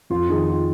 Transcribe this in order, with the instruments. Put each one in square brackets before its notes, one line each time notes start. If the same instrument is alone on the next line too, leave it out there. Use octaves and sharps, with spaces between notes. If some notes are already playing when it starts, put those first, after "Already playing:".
[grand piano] F2 F4
D#3 G#4
F4